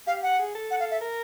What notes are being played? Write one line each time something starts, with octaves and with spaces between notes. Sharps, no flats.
G4 F5
F#5
G#4
A4
F#5
F5
E5
A#4